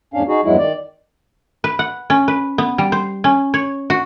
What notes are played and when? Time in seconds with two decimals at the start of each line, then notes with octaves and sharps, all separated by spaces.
0.14 E2 G#2 C#4 D4 F5
0.28 D#4 F#4 G#4
0.44 E2 G2 F#3 G#3 E4
0.58 D#3 D5
1.64 B4
1.79 F#5
2.10 C#4
2.28 B4
2.58 B3
2.78 G3
2.92 C5
3.24 C#4
3.54 C#5
3.90 F#4